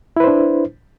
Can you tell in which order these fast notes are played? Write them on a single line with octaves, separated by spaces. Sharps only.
E4 B4 C5 D4